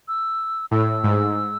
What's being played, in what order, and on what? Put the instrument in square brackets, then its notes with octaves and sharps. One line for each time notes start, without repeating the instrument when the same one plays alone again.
[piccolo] E6
[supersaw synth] A2 [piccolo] E6
[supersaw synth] G#2